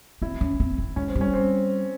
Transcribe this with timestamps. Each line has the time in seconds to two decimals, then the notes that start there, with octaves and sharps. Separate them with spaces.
0.22 C4 E4
0.41 C#4
0.60 C4
0.78 C4
0.96 G#3 C#4
1.08 C4
1.15 G3
1.21 C#4
1.34 C4